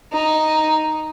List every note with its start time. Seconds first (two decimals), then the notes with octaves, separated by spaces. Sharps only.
0.13 D#4